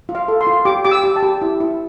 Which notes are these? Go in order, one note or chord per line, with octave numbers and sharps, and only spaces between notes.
F4
F5
A4
C6
F4
G4 D6
G4 D6
E6
G4
A5
G4
E4
E4